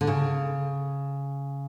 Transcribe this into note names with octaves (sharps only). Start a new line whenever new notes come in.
D3
C#3